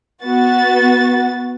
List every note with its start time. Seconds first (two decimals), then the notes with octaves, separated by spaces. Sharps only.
0.24 B3 F#4 A6